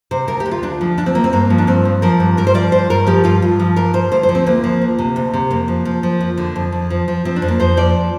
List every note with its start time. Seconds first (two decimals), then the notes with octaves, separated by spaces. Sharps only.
0.11 C3 C5
0.28 D2 A#4
0.40 G4
0.46 D2
0.51 F4
0.63 D2 D4
0.81 F3
0.98 D2 D4
1.06 C4
1.15 D2 A#3
1.24 C4
1.33 G2 A#3
1.50 F3
1.58 D4
1.67 G2 C4
1.85 F3
2.02 F3 A#4
2.20 G2
2.37 G2 A#4
2.47 C5
2.54 F3 D5
2.72 G2 C5
2.90 G2 A#4
3.07 F3 G4
3.24 G2 F4
3.42 G2
3.60 F3
3.76 G2 A#4
3.93 G2 C5
4.12 D2 C5
4.23 C5
4.29 F3
4.35 C4
4.46 D2 A#3
4.64 F3
4.82 D2
4.99 C3
5.16 D2
5.34 C3
5.51 F2 A#3
5.68 F3
5.85 F3
6.03 F3
6.21 F2
6.38 D3
6.56 F2
6.72 F2
6.90 F3
7.08 F3
7.25 F3 C4
7.36 D4
7.42 F2
7.48 A#3
7.60 F2 C5
7.77 F3 D5